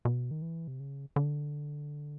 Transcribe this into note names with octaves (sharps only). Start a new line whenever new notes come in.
B2
D#3
E3
C3
C#3
D3